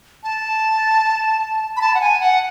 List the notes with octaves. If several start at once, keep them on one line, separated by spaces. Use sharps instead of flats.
A5
B5
A5
F#5
G#5
F#5